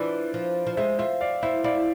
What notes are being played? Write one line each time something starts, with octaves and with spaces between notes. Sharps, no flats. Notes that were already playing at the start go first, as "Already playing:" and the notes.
Already playing: E3 D4 F4 B4 C5 D5
F3
F3
G#3 C5 E5
F4 C5 E5
D5 F5
E4 C5 E5
E4 D5 F5